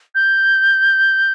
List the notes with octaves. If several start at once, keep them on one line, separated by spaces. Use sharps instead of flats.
G6